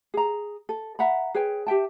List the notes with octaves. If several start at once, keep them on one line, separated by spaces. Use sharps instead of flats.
G#4 A#5
A4
E5 F#5 A#5 B5
G#4 B4 C#5 G5
G4 E5 G5 A5